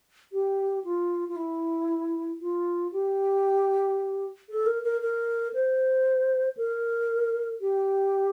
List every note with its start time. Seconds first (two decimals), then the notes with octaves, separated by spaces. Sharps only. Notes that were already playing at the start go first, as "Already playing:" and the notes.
0.33 G4
0.85 F4
1.29 F4
1.36 E4
2.41 F4
2.92 G4
4.49 A4
4.66 A#4
4.84 A#4
5.01 A#4
5.54 C5
6.57 A#4
7.61 G4